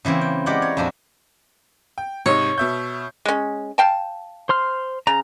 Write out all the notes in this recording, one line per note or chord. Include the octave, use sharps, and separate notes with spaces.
C#3 E3 A#3 C4
G5
G#3 G4 A#4 D5 F#5
C#5
F2 A#2 F3 D4 F#4
G5
G#2 C3 D#4 C#5
B2 E5 G6
G#3 C#4
F5 G5 A5
C5 C6 F6
C#3 A#5